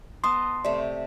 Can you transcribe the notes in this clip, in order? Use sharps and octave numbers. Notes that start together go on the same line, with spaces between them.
B3 D#5 A5 C6 D#6
C3 A3 D5